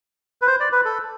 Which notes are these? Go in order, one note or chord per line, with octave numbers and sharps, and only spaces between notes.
B4
C5
D5
B4
A4